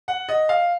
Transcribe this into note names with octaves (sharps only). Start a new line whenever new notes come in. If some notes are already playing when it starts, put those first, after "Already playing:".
F#5
D#5
F5